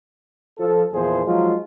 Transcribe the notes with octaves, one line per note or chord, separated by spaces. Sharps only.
F3 A4
E2 A#2 E3 F3 G#4 C5
F3 F#3 G#3 D#4 F4